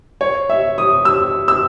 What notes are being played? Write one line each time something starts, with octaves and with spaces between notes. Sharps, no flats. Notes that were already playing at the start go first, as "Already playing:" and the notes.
C#5
E5
D#6
E6
E6